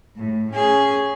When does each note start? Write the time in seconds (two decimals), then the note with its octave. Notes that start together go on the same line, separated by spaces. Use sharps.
0.17 A2
0.54 C#4 G#4